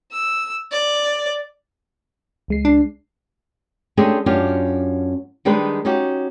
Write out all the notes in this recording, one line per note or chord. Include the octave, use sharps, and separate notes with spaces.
E6
D5
C#2 G#3 C7
D4
G#3 A3 C#4 D4 G4 G#4
F#2 C#4 D4 F4 G4
D#3 G3 G#3 D4 D#4 B4
C#4 D#4 F#4 G4